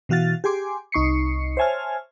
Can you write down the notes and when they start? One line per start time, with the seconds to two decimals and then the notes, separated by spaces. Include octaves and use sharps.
0.09 B2 E3 F#4 F5 A6
0.44 G4 G#4 G#5 C6 D6
0.92 C2 D#4 C#6 C7 C#7
1.57 C5 C#5 E5 G#5 A5 F6